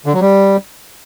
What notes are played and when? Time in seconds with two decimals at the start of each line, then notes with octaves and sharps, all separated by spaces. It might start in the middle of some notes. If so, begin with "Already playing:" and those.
0.06 D3
0.13 F#3
0.21 G3